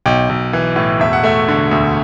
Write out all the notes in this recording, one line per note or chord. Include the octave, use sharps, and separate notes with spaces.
B1 G5
B1
E3
A2
E1 E5
F#5
A3 E5
D3
D2